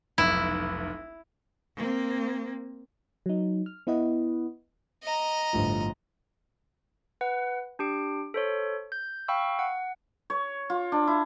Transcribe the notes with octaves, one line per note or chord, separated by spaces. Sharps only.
F1 B1 E4
A#3 C4
F#3 D#4
F6
B3 E4 B4 D#5 F#5
D#5 A#5
G1 A2 F3
B4 F#5
D4 G4 D7
A4 C5 C#5
G6
F5 G5 B5 C#6 E6
F#5
C#5
F4
D4
E4